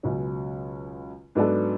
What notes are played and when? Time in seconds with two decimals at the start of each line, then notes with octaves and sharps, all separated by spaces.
0.03 C#2 B2 F#3 C#4
1.35 G#2 F#3 B3 D4 A4